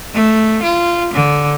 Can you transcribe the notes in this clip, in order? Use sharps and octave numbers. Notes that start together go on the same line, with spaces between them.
A3
F4
D3